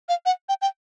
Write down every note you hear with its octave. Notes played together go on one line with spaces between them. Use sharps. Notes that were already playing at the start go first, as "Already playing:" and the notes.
F5
F#5
G5
G5